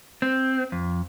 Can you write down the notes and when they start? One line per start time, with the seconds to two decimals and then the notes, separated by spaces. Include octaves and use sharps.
0.22 C4
0.72 F2